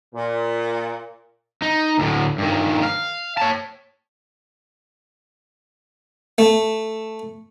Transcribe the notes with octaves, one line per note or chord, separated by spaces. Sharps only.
A#2
D#4
D2 A2
G2 D#3
F5
C#5 A5
A3